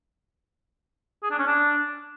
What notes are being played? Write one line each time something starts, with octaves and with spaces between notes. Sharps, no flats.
G#4
D4
C#4
D4